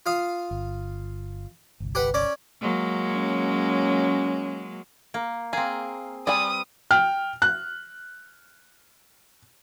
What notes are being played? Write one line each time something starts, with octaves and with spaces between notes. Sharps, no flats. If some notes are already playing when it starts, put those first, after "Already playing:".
F4 F5 D#6
G1
G1 C2
G4 B4 F#5
C#4 D5
F#3 G#3 A#3
C#4
A#3
A#3 C4 G#4
G3 C4 B4 D5 G#5 D#6
G5 F6
F#6